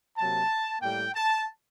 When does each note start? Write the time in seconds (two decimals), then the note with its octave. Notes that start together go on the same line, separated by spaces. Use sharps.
0.18 C3 F#3 A#3 A5
0.82 A2 G3 A#3 G5
1.15 A5